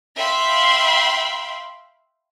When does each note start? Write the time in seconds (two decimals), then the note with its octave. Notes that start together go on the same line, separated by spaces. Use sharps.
0.18 E5 F5 G5 B5 C6